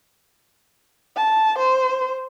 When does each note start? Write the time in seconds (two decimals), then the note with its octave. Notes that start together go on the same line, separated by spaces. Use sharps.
1.17 A5
1.59 C5